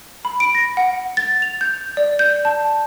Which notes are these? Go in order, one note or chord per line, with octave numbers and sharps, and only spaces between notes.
B5
D7
A#6
F#5
A6
F7
G6
D5
G6
A5